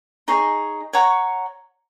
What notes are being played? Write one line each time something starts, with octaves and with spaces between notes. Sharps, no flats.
D#4 G#4 C#5
C#5 F#5 A#5 C#6